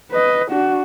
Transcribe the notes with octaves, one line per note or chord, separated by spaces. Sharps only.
B4 D#5
D4 F#4